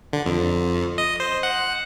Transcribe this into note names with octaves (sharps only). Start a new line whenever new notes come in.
D3
F2
D#5
C5
F#5